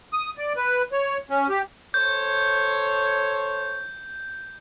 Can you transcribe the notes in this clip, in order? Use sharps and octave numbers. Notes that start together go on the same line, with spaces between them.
D#6
D5
B4
C#5
C#4
G4
A4 C5 C#5 G6